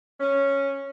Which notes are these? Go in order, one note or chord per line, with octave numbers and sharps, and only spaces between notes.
C#4